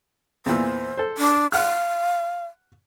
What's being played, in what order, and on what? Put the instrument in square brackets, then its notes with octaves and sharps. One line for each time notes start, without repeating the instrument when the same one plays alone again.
[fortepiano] E2 A#2 E3 [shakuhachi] C5
[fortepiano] A4 C5
[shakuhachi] D4
[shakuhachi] F5 [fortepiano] F#5 F6